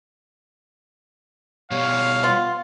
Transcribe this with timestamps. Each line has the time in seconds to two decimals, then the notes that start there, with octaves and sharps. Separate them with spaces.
1.71 B2 G3 C#5 F5
2.23 B3 F4